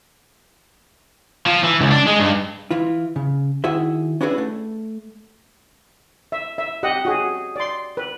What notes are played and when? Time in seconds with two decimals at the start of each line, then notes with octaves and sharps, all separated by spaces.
1.46 F3
1.63 E3
1.81 C#2
1.92 D4
2.08 G#3
2.20 G2
2.71 E3 E4 F4
3.16 C#3
3.64 D#3 E4 F#4 G#4 E5
4.21 C#4 D4 E4 F#4 G#4 B4
4.38 A3
6.32 E5
6.58 E5
6.83 G4 D#5 F#5
7.05 F#4 G#4
7.56 D5 C6
7.97 B4